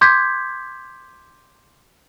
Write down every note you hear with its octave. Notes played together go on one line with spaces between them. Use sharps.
C6 D6 G6 G#6 B6